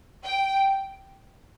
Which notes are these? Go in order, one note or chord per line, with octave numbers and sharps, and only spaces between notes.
G5